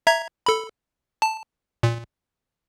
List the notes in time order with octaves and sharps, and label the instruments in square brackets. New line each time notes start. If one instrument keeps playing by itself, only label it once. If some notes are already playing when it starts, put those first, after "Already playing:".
[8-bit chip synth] E5 A#5 G#6
A4 B5
A5
A#2